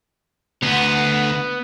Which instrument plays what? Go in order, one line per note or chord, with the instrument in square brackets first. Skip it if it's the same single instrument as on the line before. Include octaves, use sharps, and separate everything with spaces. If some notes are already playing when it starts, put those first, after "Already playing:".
[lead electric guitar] D2 [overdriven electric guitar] B3